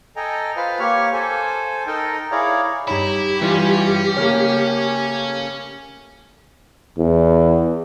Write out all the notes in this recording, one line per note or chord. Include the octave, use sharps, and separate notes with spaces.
A4 D#5 G5 G#5 A#5
F4 B4 C5 F5 F6
A#3 G4 C#5 C#6 F6
A4 C5 G#5
D#4 A4 A#4 D#5 G5
E4 G#4 C#5 D5 F5 A#5
G2 D#4 E4 G4 C#5 A#5 B5
E3 G3 C#4 F4
C#3 A3 A#3 C#5 F6
E2